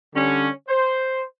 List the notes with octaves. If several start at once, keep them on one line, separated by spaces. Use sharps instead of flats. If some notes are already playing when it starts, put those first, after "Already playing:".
D3 G3 C#4
C5